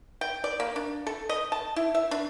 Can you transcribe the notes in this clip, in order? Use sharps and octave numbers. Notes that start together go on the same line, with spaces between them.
G5
D5
A#3
D4
A4
D#5
A5
E4
E5
D4